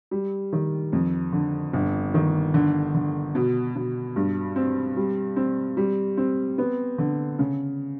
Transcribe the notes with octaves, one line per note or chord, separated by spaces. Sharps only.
G3
D#3
F2
D3
G1
D#3
D3
D3
B2
B2
G2
C4
G3
C4
G3
C4
B3
D3
C#3